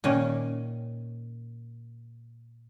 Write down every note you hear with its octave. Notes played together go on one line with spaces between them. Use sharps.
A#2 D#3 C#4